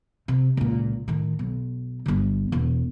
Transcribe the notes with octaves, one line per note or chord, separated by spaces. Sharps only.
C3
C#2 A#2
A2 D#3
B1
G1 D3
E1